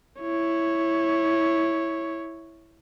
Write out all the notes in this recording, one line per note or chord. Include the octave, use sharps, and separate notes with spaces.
E4 C#5